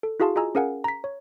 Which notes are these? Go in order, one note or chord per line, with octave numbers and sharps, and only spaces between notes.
A4
E4 F#4 G#4 F5 A5 C6
F4 G#4 D#5 G#5 A#5 E6
C#4 G#4 A#4 F5 F#5 G#5
A#5 B6
C#5